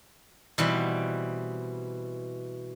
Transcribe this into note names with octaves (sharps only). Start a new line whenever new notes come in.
B2 E3 G3 C4